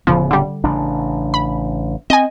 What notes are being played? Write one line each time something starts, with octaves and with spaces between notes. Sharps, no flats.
D1 C#3 F3 B3
D3 G3
A1 C#3 D4
B5
C4 D#5 G#5